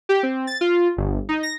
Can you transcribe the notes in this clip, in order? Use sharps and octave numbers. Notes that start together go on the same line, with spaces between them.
G4
C4
A6
F4
G1
D#4
A#6